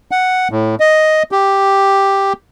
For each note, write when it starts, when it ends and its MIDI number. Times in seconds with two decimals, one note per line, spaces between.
0.11 0.48 78
0.51 0.75 45
0.80 1.23 75
1.32 2.33 67